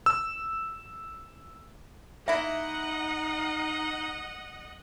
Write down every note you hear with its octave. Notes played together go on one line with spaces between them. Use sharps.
E6
A#3 D#4 E4 D#5 E5 F#5